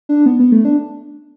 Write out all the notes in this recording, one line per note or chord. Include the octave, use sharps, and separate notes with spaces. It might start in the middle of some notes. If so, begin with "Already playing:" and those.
D4
B3
B3
A3
D4